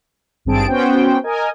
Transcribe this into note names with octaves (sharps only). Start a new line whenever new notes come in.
G#1 G2 C4 G#4 A5 D7
B3 C#4 F#4 C5 G5
A#4 D#5 G#5